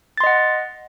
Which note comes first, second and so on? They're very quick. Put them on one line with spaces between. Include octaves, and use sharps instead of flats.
A6 C6 D#5 F#5